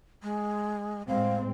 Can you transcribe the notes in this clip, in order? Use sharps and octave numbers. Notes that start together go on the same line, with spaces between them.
G#3
A2 G#3 C4 F5